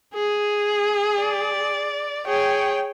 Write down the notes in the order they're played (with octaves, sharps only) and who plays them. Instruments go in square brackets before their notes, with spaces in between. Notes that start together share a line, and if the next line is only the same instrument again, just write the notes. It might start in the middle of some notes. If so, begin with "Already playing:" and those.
[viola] G#4
[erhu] D5
[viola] G#4 C#5 [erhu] G5